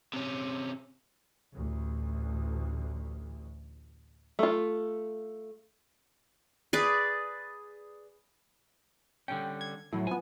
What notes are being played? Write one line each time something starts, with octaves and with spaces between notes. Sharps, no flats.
C3 C#4
A1 D2
A3 F4
G#4 B4 D5
D3 G3 C#4 G5
G#6
A2 F#3 E4
F3 B3 G#5